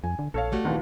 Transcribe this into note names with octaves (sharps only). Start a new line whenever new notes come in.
F2 G#5
D3
A#1 A4 C#5 F5
G3 A3 F#4
D2 A#2 D#3 E3